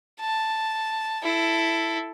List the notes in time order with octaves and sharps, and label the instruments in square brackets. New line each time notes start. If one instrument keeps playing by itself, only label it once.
[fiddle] A5
E4 A4